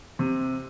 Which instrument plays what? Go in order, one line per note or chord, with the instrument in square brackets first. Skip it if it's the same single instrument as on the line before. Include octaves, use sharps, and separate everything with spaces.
[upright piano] C3